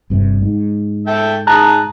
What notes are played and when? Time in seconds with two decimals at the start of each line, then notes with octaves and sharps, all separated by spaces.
0.10 G1 G2 C3
0.42 G#2
1.07 A4 E5 G5
1.47 D#4 G#4 A5 A#5 F#6